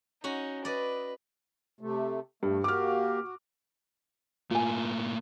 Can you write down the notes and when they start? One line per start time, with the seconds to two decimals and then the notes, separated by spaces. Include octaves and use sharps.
0.24 C#4 D#4 F#4
0.65 B4 D5 D#5
1.81 C3 A3
2.43 G2 A3
2.64 A#3 F#4 G4 D6 F6
3.23 F#4
4.51 A2 A#3 F4 G#5